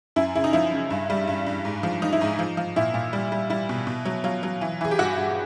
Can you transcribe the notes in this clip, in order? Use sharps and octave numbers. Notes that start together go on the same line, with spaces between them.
F#2 E4
C#3 E4
D#4
F3 E4
C#3
G2
G3
G2
G2
G#2
F3
F3 D#4
E4
G#2 D#4
F3
F3
A#2 E4
A#2
G3
G3
G3 E4
B2
B2
F#3
F#3 F4
F#3
E3
E3 G#4
G4
G2 F#4
G2